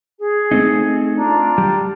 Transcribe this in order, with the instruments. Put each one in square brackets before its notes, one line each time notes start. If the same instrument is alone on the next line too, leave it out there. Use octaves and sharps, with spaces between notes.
[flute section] G#4
[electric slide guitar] A3 C4 D#4
[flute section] D4 F4 A#5
[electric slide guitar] G3